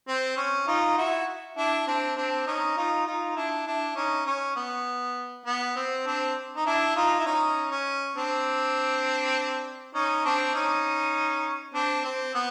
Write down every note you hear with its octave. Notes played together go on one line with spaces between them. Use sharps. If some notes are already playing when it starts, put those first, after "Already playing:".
C4
C#4
D#4 F4
E4 F#4
D4 E4
C4 D4
C4 D4
C#4 D#4
D#4 F4
D#4 F4
D4 E4
D4 E4
C#4 D#4
C#4
B3
B3
C4
C4 D4
D#4
D4 E4
D#4 F4
E4
C#4 D#4
C#4
C4 D4
C#4 D#4
C4 D4
C#4 D#4
C4 D4
C4
B3